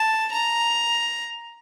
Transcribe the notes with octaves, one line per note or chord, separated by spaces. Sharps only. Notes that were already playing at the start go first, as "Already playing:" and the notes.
Already playing: A5
A#5